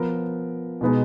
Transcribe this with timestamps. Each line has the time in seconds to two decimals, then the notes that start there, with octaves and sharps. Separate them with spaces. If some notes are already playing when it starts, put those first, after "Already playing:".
Already playing: F3 B3 F4 A#4
0.81 B2 G#3 B3 D#4